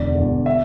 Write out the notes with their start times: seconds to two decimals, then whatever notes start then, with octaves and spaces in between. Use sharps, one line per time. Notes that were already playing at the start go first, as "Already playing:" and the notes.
Already playing: E1 E2 D3 D5
0.15 E1 E2 D3
0.46 E5